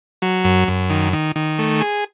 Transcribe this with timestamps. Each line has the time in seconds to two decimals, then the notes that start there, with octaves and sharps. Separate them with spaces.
0.22 F#3
0.44 F#2
0.68 F#2
0.90 D#3
1.13 D#3
1.36 D#3
1.59 A3
1.81 G#4